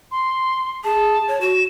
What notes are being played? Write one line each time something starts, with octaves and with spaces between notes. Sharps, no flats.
C6
G#4 A5
C#5
F#4 E7